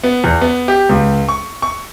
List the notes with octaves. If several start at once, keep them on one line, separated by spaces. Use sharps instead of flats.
B3
E2
B3
G4
C#2
C#6
C#6